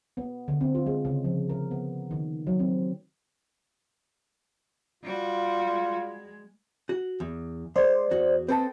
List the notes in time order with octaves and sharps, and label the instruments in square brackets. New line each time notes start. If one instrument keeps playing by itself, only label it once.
[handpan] B3
D3
C4
F4
G#3
C#3
F3
A#4
B3
D#3
F#3
C4
[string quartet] G3 F#4 [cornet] F4
[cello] G#3
[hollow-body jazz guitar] F#4
E2
[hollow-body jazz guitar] G#3 [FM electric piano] C5 D5
[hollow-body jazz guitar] E2 F#4
[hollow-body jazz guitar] C4 A4 D#5 [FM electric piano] B4 A5